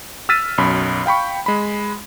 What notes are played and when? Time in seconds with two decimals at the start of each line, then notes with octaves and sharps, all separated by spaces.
0.29 E6 F6 A6 B6 D#7
0.58 B1 F#2 B5
1.06 F5 G5 B5 C#6
1.46 G#3 B5